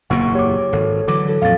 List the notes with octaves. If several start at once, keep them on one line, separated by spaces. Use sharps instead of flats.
F#1 E2 A#2 A#3 F#5 C#6
G4 C#5 D6
G#1 A4
D3 E3 F#3 D6
A4
F2 A#2 F#3 F5 A6